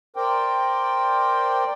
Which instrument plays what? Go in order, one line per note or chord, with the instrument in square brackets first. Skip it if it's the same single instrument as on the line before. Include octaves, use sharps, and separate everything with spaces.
[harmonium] A#4 C5 D5 G5